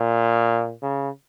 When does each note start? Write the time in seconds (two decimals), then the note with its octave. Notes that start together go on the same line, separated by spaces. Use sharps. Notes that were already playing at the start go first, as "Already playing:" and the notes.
Already playing: A#2
0.82 C#3